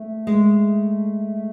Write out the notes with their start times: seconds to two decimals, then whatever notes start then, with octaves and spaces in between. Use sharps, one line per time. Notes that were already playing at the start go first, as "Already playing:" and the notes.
Already playing: A3
0.27 G#3